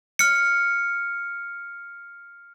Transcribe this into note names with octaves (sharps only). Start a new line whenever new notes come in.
F6 C#7